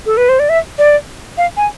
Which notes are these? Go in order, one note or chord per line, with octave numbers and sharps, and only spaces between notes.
A4
B4
C5
D5
E5
D5
F5
G#5